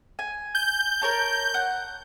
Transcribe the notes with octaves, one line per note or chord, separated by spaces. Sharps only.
G#5
G6
A#4 C#5 A5
F#5